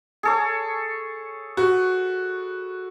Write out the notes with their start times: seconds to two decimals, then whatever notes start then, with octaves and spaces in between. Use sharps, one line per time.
0.23 G#4 A4 C#5
1.57 F#4 B4